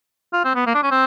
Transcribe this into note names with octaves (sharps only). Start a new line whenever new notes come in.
F4
C4
B3
A#3
D4
C#4
C4